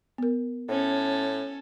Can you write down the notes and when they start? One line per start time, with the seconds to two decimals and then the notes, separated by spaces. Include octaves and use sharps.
0.18 B3 A#4
0.69 A2 C#4 A4